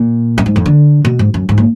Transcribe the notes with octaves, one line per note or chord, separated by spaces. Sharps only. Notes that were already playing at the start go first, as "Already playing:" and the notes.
Already playing: A#2
F#2
G#2
F2
D3
B2
G#2
F#2
G#2
A#2